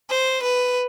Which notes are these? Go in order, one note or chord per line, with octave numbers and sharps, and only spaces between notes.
C5
B4